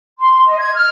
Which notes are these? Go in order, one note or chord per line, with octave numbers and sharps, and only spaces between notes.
C6
D#5
G#6
F6